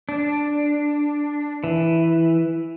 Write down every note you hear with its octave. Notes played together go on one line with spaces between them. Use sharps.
D4
E3